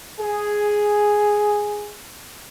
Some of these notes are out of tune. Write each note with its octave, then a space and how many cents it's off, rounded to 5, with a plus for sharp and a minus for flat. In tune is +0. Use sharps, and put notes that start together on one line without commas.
G#4 +0